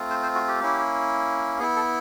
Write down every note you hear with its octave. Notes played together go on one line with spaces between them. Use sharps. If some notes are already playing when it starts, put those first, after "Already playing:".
Already playing: A3 C4 F4
C5
C5
F#4
G4
A#3 C#4 E4
B3 E4 G#4
A4